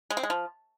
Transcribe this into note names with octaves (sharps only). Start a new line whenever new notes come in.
G#3
C4
G#3
F3